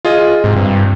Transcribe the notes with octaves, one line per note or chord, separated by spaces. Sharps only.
F4 G#4 D#5
G#2 C3
G2